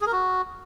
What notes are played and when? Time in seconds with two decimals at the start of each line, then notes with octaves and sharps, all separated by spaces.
0.01 G#4
0.06 A#4
0.12 F#4